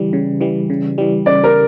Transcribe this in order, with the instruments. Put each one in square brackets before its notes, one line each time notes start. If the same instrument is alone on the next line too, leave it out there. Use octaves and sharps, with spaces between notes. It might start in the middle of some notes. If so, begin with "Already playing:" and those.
Already playing: [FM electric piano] C#3 E3 G3
C#3
E3 G3
C#3
E3 G3
[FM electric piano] C#3 [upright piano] D5
[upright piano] A#4